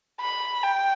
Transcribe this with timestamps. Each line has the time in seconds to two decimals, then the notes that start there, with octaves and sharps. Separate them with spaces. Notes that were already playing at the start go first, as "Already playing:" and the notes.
0.21 B5
0.63 G5